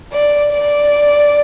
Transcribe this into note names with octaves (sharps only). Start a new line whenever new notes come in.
D5
D5